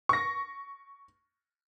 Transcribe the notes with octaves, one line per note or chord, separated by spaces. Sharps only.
C#6 A#6